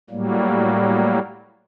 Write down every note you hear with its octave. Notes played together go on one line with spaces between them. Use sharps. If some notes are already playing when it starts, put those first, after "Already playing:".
A2 F#3 G3 A#3